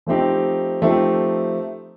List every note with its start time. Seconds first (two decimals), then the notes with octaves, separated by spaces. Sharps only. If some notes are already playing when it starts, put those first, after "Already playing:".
0.07 F3 A3 C4 D#4 G4
0.82 F3 A3 C4 D#4 G4